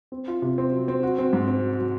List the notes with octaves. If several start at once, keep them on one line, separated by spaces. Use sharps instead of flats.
C4
F4
C3
C4
F#3
C4
F#4
C4
G#2
C4
F#3
F#3